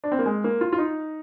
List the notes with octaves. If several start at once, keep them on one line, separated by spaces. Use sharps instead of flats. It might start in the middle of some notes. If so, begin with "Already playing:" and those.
D4
C4
A#3
G#3
A#3
F4
F4
D#4